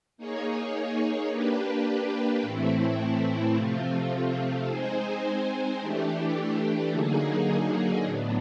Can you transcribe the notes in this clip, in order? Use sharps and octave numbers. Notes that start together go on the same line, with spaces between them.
A#3 D#4 G#4 C#5
A#3 D4 G4 B4
A2 E3 A3 C4 E4
C3 F3 A3 C4 F4
G#3 C4 D#4 G#4 C5
E3 A3 D4 G4
D3 F#3 A#3 D#4 G#4
A2 F#3 B3 D4